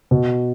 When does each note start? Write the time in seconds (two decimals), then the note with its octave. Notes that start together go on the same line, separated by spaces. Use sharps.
0.11 B2